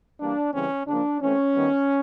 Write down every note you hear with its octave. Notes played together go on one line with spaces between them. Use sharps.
E3 G3 A#3 D4
C#3 E3 G3 C4 C#4
C#3 F3 A#3 D4
E3 A3 C4 C#4
D#3 G3 B3